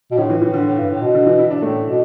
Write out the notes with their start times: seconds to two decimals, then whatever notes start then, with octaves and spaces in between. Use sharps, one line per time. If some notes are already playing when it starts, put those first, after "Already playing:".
0.11 B2
0.18 A2 D3
0.30 E3
0.42 A2 E3
0.54 D3
0.66 A2
0.78 G2
0.90 A2
1.02 B2
1.14 D3
1.26 E3
1.39 E4
1.50 D4
1.62 A2 A3
1.87 B2